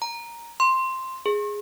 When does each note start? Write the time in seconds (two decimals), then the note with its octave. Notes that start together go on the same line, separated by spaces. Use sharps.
0.02 A#5
0.60 C6
1.26 G#4